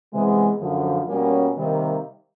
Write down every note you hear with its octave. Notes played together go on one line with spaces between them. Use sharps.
C3 E3 G#3 B3
F#2 D3 F3
B2 G3 A#3 C#4
C3 D#3 G3 A#3 D#4